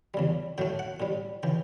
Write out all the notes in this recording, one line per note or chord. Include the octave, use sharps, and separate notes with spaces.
E2 C#3 G3
A2 F#3 A3 G5
F#5
A2 G3
C#3 E3 G5